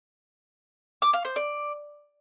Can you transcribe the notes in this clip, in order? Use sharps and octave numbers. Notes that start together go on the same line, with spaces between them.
D6
F5
C5
D5